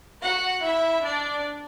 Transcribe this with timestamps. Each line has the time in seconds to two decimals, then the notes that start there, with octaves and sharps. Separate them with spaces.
0.22 F#4 F#5
0.63 E4 E5
1.05 D4 D5